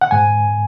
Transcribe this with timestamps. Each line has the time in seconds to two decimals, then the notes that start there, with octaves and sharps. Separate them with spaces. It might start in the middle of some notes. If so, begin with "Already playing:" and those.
0.01 F#5
0.11 G#2 G#5